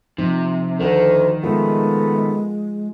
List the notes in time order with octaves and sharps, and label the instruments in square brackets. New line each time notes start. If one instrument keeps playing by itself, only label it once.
[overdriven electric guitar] C3 [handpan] F3 D#4
[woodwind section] D2 [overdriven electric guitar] D#3
[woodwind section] A#2 A3 B3 [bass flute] G#3 [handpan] F4